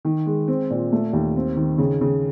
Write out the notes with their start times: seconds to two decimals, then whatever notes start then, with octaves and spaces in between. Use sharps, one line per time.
0.05 D#3
0.26 G#3
0.48 C4
0.70 A#2
0.92 A3
1.13 D#2
1.36 C4
1.56 D#3
1.78 C#3
2.01 C#3